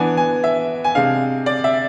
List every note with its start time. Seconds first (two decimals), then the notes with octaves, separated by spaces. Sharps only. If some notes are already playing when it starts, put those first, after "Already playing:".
Already playing: E3 B3 D4 G#5
0.17 G#5
0.44 E5
0.84 G#5
0.95 C3 G#3 D4 F5
1.46 D5
1.64 E5